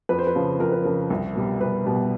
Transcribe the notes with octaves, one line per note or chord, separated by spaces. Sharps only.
F2 B4
C5
B4
C#3 F3
F2 A#4
B4
C#3 F3 A#4
C2
B2 G3
C2 B4
B2 G3